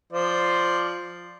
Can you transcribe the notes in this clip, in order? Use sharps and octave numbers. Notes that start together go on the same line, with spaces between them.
F3 C5 D5